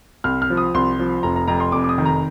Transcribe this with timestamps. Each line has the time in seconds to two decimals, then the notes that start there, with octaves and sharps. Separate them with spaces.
0.24 C2 F6
0.42 F6
0.50 F3
0.57 D#6
0.74 C2 C6
0.99 F3
1.23 F1 A#5
1.36 A#5
1.48 F2 A#5
1.60 C6
1.72 F1 D6
1.84 D6
1.89 D#6
1.98 D#3
2.06 A#5